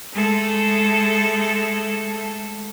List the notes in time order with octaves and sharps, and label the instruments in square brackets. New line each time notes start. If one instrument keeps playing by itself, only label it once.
[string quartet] G#3 A3 A4